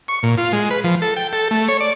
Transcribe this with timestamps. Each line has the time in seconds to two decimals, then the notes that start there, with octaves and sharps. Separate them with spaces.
0.08 C#6
0.23 A#2
0.38 F4
0.53 G#3
0.71 B4
0.84 F3
1.02 A4
1.16 G5
1.33 A4
1.51 A3
1.68 C#5
1.80 D5